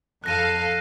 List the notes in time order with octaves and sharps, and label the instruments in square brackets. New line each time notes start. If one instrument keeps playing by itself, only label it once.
[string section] F2 A4 F5 [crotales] F#6 A#6 D#7